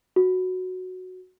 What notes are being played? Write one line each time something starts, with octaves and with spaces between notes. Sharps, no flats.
F#4